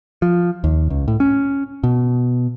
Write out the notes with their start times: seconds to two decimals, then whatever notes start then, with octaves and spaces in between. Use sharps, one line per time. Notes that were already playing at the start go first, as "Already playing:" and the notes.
0.22 F3
0.64 D#2
0.90 C#2
1.08 A2
1.20 C#4
1.84 B2